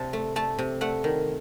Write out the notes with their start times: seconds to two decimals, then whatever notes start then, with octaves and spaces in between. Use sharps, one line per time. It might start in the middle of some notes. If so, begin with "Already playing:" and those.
Already playing: C3 A5
0.13 A3
0.36 A3 A5
0.58 C3
0.81 A3 F#5
1.04 D#3